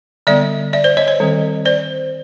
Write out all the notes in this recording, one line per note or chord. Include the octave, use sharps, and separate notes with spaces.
D3 G3 B3 D5 E5
D5 E5
C5 D5
C#5 D#5
C#5 D#5
D#3 G3 C4
C5 D5